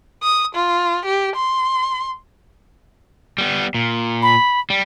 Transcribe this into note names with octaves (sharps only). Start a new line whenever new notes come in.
D#6
F4
G4
C6
G3 B3
A#2
B5
G3